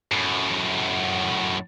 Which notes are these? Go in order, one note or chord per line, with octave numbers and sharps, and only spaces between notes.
F#2 A2